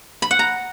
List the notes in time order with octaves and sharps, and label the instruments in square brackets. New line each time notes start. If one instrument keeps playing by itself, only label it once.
[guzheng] B5
F#5
A#5